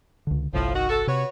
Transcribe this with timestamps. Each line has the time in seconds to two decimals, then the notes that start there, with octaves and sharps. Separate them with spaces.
0.27 C#2 D3
0.53 G1 C2 A2 F3
0.74 D#3 F#4
0.89 F#4 A4
1.07 C3 F#4 B4 C#5